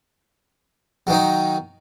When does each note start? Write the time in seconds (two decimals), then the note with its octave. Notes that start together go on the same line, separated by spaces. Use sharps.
1.07 F#3
1.10 D#3
1.13 D#4